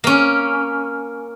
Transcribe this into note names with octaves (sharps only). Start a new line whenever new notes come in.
A#3 C#4